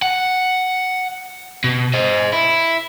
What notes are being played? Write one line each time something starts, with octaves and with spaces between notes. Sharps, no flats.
F#5
B2
C5 D#5
E4